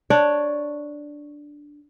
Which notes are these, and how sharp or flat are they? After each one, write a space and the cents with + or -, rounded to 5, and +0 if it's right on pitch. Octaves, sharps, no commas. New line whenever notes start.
D4 +0 C#5 +0